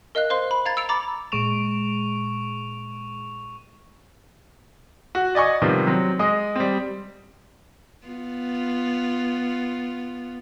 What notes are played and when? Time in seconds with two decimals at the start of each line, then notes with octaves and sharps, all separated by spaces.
0.15 A#4 D#5 F5 F#6
0.30 C5 F5 C6
0.51 B5
0.66 F5 A#5 G#6 A6
0.77 E6 C#7 D7 F7
0.89 A#5 B5 D6 A6
1.32 A#2 G#3 C#6 D7 E7 F7
5.15 F#4
5.35 D5 D#5 G#5 C#6
5.62 C3 D#3 F3 G3 B3
5.87 F#3 C4
6.19 G#3 D#5 D#6
6.56 G3 C4
8.07 B3 F4